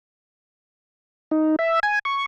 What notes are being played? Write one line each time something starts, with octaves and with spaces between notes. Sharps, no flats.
D#4
E5
G#5
C#6